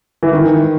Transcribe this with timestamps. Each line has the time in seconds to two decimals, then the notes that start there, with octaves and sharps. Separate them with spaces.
0.23 E3
0.33 D#3